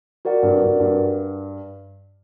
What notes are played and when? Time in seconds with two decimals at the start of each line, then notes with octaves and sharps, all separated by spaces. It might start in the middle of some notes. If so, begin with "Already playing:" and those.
0.25 F#4 A#4 D5 F#5
0.43 G2
0.61 G2
0.80 G2